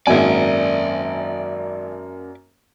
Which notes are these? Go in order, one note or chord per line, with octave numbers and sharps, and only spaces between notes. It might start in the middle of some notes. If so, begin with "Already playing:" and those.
G#1 F#2 A#3 D5 E5 G#5